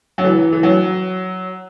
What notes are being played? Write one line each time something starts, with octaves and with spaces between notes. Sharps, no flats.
F#3
E3
E3
F#3